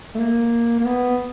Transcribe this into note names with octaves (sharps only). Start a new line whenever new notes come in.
A3
A#3
A#3
B3